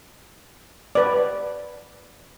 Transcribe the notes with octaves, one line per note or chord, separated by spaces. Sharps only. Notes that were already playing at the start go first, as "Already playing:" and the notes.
B4 D5